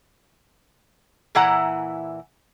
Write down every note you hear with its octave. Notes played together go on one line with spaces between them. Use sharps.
A#2 E3 E4 F#5 A#5